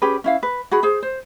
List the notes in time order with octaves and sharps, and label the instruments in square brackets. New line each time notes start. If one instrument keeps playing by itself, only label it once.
[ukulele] C#4 G4 G#4 B4
C#4 E4 F5
B4
F#4 G#4 B5
G#4 C5
C5